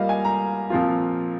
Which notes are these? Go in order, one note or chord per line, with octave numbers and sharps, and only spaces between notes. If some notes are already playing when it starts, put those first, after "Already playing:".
Already playing: G3 A#3 F4 D#5 F5
G#5
A#5
A#2 F3 C4 F4